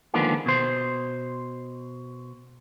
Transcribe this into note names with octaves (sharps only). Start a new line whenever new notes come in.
D3 D#3 F3 G#3 A#3 B3
B2 C5